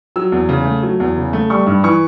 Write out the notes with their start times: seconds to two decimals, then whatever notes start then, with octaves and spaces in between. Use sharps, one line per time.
0.16 F#3 E6
0.32 E2
0.49 C#3
0.65 A3
0.83 F#3
1.00 E2
1.17 C#3
1.33 A3
1.50 G3 C#6
1.66 G2
1.83 E3 C#6